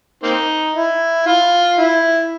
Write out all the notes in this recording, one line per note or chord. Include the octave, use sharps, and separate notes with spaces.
A#3 C4 D#4
E4
F4
E4